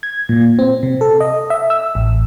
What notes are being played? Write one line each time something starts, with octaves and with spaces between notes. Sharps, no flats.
G#6
A#2
C4
C3
A4
D#5
E5
E6
A1